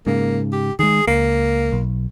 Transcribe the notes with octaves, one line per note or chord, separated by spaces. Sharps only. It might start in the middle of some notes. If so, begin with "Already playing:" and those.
G#2 C#3 A#3
G4
D#3 G#3 G#4
C#2 A#3
B1